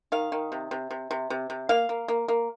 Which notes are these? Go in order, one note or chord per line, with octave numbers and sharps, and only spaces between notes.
D#3 F5
D#3
C3
C3
C3
C3
C3
C3
A#3 F5
A#3
A#3
A#3